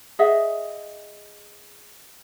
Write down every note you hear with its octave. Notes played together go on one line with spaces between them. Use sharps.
G#4 D#5 E5 F#5